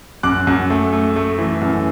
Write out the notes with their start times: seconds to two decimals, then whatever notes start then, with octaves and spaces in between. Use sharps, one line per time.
0.23 F#2 D6 F#6
0.47 F#2
0.70 A3
0.93 A3
1.16 A3
1.39 E3
1.62 F#2